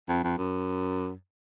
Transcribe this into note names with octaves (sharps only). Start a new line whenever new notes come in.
F2
F2
F#2